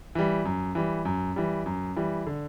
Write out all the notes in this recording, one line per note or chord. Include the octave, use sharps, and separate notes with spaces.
E3 G3
F#2
E3 G3
F#2
E3 G3
F#2
E3 G3
D3